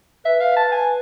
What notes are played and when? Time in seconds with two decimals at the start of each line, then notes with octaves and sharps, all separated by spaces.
0.25 B4 E5
0.41 F5
0.56 A5
0.72 G#5